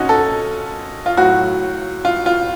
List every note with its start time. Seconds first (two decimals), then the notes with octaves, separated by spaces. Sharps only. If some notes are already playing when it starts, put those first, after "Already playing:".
Already playing: A#2 C#4 D#4 F#4
0.09 A4
1.06 F4
1.17 A2 F#3 F#4
2.05 F4
2.26 F4